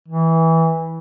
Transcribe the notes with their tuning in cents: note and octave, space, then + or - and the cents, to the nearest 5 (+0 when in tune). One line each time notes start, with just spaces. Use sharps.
E3 -15